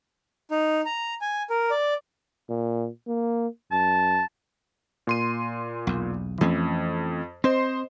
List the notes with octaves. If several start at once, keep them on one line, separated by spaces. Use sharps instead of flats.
D#4
A#5
G#5
A#4
D5
A#2
A#3
F#2 A5
A#2 C6 D#7
B1 E2
F2 E3 A3 C#4
C4 C5 D#5 C6